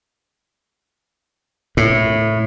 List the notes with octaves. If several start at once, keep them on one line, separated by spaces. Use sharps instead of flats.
A2